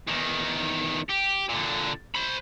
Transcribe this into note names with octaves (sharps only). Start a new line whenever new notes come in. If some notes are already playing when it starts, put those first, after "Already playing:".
E2 D#3
G4
A#2 D3
C5 B5